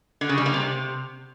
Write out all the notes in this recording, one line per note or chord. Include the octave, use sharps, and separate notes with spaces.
D3
C#3
G3
A#3
C3